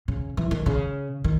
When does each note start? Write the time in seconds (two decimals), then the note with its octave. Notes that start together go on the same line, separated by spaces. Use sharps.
0.08 C#3
0.37 E3
0.51 D#3
0.66 C#3
1.24 D#3